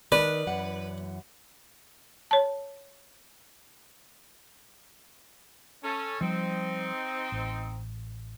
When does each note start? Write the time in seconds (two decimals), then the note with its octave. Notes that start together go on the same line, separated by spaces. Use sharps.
0.12 D#3 B4 D5
0.47 F#2 E3 F#5
2.31 C#5 A5
5.83 C#4 A4
6.21 F3 G3 C4 D#4
7.32 A1